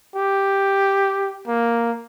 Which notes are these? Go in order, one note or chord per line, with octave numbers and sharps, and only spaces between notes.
G4
A#3